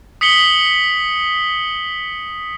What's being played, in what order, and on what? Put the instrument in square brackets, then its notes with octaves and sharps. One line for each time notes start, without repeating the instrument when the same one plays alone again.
[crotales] D#6 B6 C#7 F#7 G7